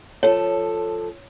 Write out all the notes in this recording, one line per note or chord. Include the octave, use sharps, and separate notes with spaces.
F3 A4 C#5